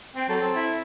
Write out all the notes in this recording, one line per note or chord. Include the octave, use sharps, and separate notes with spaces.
C4 G5
F#3 A4
C4
E4